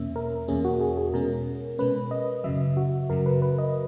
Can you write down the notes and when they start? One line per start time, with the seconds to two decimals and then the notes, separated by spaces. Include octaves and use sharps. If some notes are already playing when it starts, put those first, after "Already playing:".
Already playing: E2 B2 A#3 C#4 E5
0.16 A#4
0.48 E2 B2 A#3 C#4 G#4
0.65 F#4
0.81 G#4
0.97 G#4
1.14 B2 G#3 C#4 A#4
1.79 B2 G#3 C#4 B4
2.11 D#5
2.44 F#2 C#3 F#3 E5
2.77 F#4
3.10 F#2 C#3 F#3 A#4
3.26 B4
3.42 B4
3.58 D#5